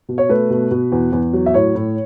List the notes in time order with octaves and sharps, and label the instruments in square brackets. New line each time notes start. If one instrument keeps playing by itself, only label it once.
[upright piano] B2
C#5
A3 B4
B2
B2
E2
E2
F#3
E5
A2 C#5
A2